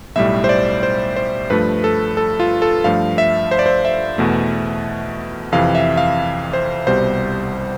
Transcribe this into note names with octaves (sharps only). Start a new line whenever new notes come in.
B1 A2 G3 E5
C5
D5
C5
C5
G2 F3 A3 B4
A4
A4
F4
A4
G2 F3 A3 F5
E5
C5
D5
C5
E5
E2 B2 A3
F2 C3 E3 F5
E5
F5
C5
C2 B2 G3 C5